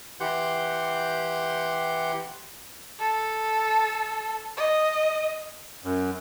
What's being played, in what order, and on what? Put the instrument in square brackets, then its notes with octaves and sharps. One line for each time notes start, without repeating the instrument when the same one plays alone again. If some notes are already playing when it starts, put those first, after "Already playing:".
[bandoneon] E3 G4 F#5 C6 G6
[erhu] A4
D#5
[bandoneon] F#2